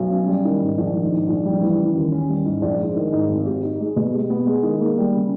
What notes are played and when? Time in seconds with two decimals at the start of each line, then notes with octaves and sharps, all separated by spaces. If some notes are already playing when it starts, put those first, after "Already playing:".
Already playing: B1
0.11 C#4
0.27 G3
0.44 D#3
0.61 G#2
0.78 A#1
0.95 D#3
1.12 G#2
1.28 A#1
1.45 G3
1.61 E3
1.78 C#3
1.96 D#2
2.12 C#4
2.29 G3
2.46 G#2
2.62 A#1
2.80 G#3
2.96 D#3
3.12 G#2
3.29 G#1
3.46 G4
3.63 D#4
3.80 G#3
3.96 B2
4.13 G4
4.30 B3
4.46 G#3
4.63 D#3
4.80 A#3
4.97 G3
5.14 C#3